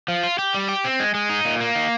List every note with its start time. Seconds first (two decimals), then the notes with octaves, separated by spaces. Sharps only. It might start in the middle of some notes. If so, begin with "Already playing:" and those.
0.08 F3
0.24 F4
0.39 G4
0.54 G3
0.69 G4
0.84 C4
1.00 G#3
1.15 G#3
1.30 D#4
1.45 A#2
1.60 A#3
1.76 D#3